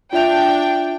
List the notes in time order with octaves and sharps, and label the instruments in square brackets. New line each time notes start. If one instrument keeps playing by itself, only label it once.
[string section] D4 G5 [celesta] F4 E5 F7